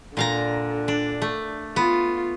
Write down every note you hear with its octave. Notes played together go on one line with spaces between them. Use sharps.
A#2 D3 F5 A#5
D4
A3
B3 F4